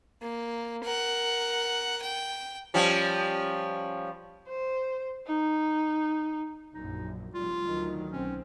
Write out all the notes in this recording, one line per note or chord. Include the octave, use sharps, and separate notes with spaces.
A#3
A#4 F#5
G5
F3 G3 C#4
C5
D#4
A#1 F#2 D#4
F1 G3 F4
D2 D#3 F#3
B1 C4 C#4